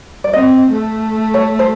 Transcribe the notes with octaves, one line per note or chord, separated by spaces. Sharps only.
D5
C4 D#5
A3
C#5
C5